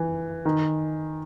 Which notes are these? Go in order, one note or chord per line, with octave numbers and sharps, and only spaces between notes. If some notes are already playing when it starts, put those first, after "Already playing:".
Already playing: E3
D#3